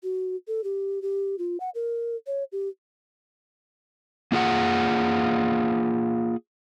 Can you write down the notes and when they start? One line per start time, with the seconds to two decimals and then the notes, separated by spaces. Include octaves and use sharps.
0.03 F#4
0.48 A4
0.64 G4
1.02 G4
1.39 F4
1.60 F#5
1.75 A#4
2.27 C#5
2.52 G4
4.32 A#3 F4 G#4 F#5